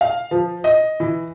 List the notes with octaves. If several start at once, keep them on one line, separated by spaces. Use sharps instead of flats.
F5
F3
D#5
E3